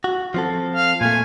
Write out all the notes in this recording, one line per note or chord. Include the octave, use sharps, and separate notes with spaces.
F#4
F3 C4 A4
F5
A#2 A3 G#5